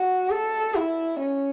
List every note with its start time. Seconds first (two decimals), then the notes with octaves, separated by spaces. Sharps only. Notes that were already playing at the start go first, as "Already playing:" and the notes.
Already playing: F#4
0.30 A4
0.75 E4
1.19 C#4